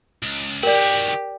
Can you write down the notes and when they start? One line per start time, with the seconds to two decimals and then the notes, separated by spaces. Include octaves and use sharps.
0.23 C#2
0.63 D#3 F#4 G4 A#4 D5